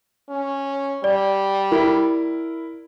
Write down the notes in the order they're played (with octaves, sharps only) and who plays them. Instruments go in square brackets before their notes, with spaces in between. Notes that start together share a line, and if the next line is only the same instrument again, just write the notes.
[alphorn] C#4
[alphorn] G3 [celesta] D5
[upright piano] E4 A#4